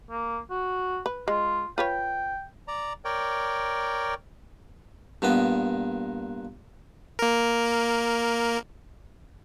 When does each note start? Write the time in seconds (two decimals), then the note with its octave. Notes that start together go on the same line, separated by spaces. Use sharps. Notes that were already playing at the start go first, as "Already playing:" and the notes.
0.10 A#3
0.50 F#4
1.06 B4
1.28 G#3 F4
1.78 F4 B4 C#5 G5
2.68 D5 A#5
3.05 A#4 C#5 D5 G5
5.22 G2 A#2 B3 D#5
7.19 A#3 A#4